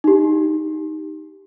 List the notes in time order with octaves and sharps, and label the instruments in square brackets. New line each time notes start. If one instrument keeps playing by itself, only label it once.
[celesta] D#4 G4